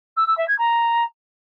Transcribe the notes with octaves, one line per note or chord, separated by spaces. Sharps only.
E6
E6
E5
G#6
A#5